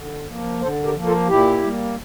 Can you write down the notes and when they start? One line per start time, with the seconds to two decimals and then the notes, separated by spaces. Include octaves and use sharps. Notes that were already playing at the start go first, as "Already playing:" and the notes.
Already playing: D3
0.28 F3 A#3
0.61 D3 A4 C5
0.84 G4 A#4
0.94 F3 A#3
1.06 F4 A4
1.28 A#2 E4 G4
1.62 G3 A#3